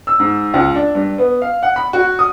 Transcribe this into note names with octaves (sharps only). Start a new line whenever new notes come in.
E6
G#2
C#2
D4
G2
B3
F5
F#5
B5
F#4
D#6